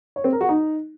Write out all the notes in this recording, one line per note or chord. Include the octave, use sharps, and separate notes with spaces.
C#5
C4
A#4
F#4
D#4